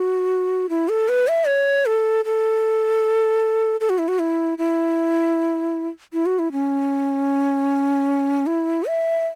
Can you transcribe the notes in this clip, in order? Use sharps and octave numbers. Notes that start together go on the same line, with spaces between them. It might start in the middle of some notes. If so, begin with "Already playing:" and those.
Already playing: F#4
E4
A4
B4
E5
C#5
A4
A4
A4
F#4
E4
F#4
E4
E4
E4
F#4
E4
C#4
E4
E5